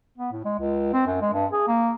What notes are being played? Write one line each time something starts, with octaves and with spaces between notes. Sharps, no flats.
B3
A2
G#3
C#2
C4
F#2
G#3
G2
G#4
A#3